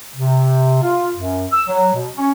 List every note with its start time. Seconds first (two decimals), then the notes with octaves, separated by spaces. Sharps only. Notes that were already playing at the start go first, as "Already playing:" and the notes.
0.16 C3
0.83 F4
1.16 F#2
1.52 E6
1.67 F#3
1.94 B2
2.16 C#4